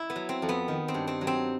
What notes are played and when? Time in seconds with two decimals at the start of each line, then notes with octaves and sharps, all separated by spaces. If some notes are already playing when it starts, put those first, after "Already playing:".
Already playing: E4
0.10 B3
0.16 F#3
0.29 C4
0.42 F2
0.49 B3
0.68 D#3
0.88 C4
0.94 G2
1.07 C4
1.21 F#3
1.27 C4